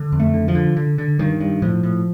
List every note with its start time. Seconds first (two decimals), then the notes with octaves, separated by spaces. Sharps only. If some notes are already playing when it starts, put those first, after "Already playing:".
Already playing: D3
0.12 F2
0.20 A3
0.34 D3
0.48 F3
0.55 D3
0.77 D3
0.98 D3
1.19 G2 D#3
1.40 G2
1.62 A2 F3
1.83 A2